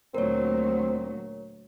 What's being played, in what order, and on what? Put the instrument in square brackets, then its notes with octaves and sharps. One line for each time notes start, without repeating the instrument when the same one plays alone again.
[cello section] D2 A#2 F#3 [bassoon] C4 [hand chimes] A#4 C#5